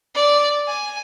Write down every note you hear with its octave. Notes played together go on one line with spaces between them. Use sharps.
D5
G#5